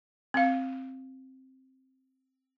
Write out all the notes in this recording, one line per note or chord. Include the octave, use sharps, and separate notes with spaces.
C4 F5